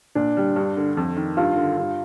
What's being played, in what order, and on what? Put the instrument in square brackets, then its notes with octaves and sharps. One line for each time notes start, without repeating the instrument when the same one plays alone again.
[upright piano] A#2 [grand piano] D4
[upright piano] G3
G2
D3
F2
D#3
[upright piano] G2 [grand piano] F4
[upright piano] D3
G2